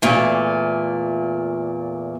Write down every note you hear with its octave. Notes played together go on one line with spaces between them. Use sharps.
E2 A#2 A3